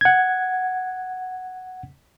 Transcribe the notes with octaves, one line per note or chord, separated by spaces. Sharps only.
F#5 G#6